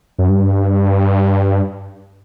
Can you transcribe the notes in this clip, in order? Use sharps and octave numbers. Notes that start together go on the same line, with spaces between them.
F#2
G2